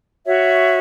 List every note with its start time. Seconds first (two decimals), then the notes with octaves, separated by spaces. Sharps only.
0.25 F#4 C#5 E5